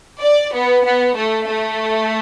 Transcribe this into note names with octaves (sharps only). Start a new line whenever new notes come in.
D5
B3
B3
A3
A3